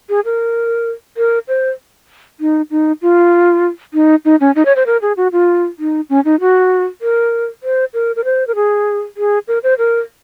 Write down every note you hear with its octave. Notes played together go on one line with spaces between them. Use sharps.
G#4
A#4
A#4
C5
D#4
D#4
F4
D#4
D#4
C#4
D#4
C#5
C5
A#4
G#4
F#4
F4
D#4
C#4
D#4
F#4
A#4
C5
A#4
A#4
C5
A#4
G#4
G#4
A#4
C5
A#4